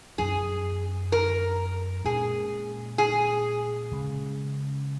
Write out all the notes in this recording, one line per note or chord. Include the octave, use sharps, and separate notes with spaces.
F#2 F#3 C#4 G#4
A#4
A#2 G#3 C#4 G#4
G#4
C#3 G#3 C#4